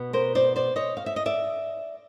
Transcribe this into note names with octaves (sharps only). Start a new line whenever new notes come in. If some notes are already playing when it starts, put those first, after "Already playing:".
Already playing: B2 B3
A#4 C5
C5 D5
C5 D5
C#5 D#5
F5
E5
D#5
D5 E5